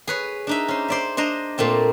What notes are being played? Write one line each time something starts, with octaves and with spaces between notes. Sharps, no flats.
G#4 B4 C#5
D4 D#4 E5
C#4 C5
C5 D5 E5
D4 C5 D#5 A#5
A#2 A3 C4 A5